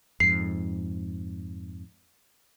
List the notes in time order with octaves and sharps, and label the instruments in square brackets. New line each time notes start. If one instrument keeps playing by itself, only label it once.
[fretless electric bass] F2 G#2 [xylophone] C7